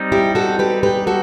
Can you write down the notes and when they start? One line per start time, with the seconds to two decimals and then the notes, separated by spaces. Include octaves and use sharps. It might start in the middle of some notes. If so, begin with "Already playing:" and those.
Already playing: G3 C4 D#4
0.12 E4 G4
0.35 F#4 A4
0.59 G4 B4
0.83 G4 B4
1.07 F#4 A4